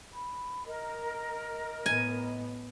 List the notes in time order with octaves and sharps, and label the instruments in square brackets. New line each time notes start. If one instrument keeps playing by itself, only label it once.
[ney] B5
[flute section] A#4 [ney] D#5
[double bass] A2 B3 [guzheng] G#5